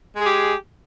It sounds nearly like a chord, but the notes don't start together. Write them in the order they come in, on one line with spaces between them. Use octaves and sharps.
G#3 G#4 G4